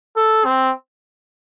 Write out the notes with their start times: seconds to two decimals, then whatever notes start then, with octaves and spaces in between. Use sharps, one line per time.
0.16 A4
0.45 C4